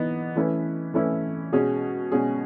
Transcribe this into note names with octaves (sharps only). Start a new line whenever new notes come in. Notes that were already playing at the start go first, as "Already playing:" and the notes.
Already playing: E3 B3 D#4
E3 A3 C#4 E4 B4
E3 A3 C#4 E4 B4
B2 G#3 C#4 G#4
B2 G#3 C#4 G#4